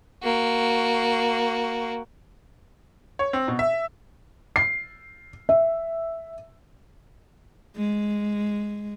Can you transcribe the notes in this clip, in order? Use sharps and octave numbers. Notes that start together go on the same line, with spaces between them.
A#3 F#4
C#5
C4
B2
E5
C7
E5
G#3